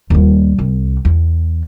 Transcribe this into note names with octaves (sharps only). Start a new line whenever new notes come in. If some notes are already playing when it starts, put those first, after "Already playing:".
D#2 G3
C2
E2